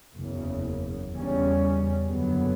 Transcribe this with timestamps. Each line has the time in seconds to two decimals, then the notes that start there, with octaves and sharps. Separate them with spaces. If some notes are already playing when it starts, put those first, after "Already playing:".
0.17 F#1 E2 C#3
1.13 E2 C#3 G3 C#4
2.08 F#1 F#2 D3 F#3 B3